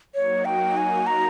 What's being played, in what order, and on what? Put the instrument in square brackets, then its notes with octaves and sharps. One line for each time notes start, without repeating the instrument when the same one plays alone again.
[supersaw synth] F#3 A#3 D#4 F#4 [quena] C#5
[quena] G5
G#5
A#5